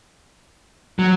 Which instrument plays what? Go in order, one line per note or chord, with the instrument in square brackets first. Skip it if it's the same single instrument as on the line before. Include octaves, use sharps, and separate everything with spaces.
[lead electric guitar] F#3